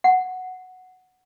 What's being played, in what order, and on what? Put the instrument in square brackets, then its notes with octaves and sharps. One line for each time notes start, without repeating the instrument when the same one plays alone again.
[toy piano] F#5